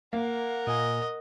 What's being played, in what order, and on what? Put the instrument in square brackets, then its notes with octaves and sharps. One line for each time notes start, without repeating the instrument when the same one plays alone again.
[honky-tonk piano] A#3 [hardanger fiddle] A#4 F#5
[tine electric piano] A#2 G#5 [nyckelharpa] D#5